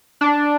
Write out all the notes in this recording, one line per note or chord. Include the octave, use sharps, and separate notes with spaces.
D4